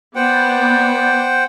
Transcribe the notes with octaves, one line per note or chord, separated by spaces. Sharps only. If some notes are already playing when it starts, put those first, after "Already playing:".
B3 C5 D5 F#5 G5